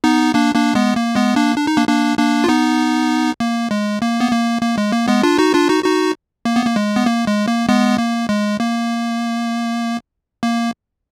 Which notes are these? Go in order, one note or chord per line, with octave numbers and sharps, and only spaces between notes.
B3 D#4
A#3 D4
A#3 D4
G#3 B3
A#3
G#3 B3
A#3 D4
D4
D#4
A#3 D4
A#3 D4
A#3 D4
F4
B3 D#4
A#3
G#3
A#3
B3
A#3
A#3
G#3
A#3
G#3 B3
D4 F4
D#4 F#4
D4 F4
D#4 F#4
D#4 F#4
A#3
B3
A#3
G#3
B3
A#3
G#3
A#3
G#3 B3
A#3
G#3
A#3
A#3